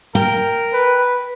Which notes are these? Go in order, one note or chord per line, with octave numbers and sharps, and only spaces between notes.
A#4 G5
B4